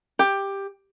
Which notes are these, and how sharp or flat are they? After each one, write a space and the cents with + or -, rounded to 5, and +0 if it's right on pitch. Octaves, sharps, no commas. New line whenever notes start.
G4 +10